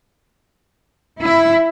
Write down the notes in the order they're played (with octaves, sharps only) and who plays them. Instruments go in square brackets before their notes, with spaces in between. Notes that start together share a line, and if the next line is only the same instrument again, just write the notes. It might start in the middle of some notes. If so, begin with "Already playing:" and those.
[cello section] E4